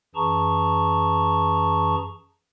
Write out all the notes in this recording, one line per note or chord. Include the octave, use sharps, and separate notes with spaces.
F#2 E3 G#4 A5 A#5 C#6